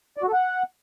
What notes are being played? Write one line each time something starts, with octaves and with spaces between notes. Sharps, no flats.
D5
F#4
A4
F#5